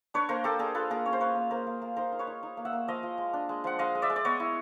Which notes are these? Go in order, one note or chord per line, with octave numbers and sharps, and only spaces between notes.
D4 B4 C#5
A#3 A#4 C5
A#3 G4 A4
D4 G#4 A#4
F4 A4 B4
A#3 G#4 A#4
C#4 C#5
C5
A#3 B4 C#5
A#3
A#3 A#4 C5
A#3
A#3
D#4 A#4 C5
D#4
B4 C#5
D#4
D#4
A#3
E5 F#5
A#3
F3 D#5 F5
F3
G#3
D4
G#3
F3 F#5
G#3 D#5 F5
G#3
D5 E5
G#3
D5
B3 C#5 D#5
E4